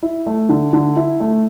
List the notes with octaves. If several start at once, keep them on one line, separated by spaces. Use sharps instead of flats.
E4
A3
D3
D3
E4
A3